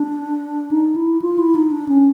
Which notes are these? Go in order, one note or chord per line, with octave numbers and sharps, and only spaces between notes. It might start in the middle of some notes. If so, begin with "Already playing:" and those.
Already playing: D4
D#4
E4
F4
E4
D#4
D4
C#4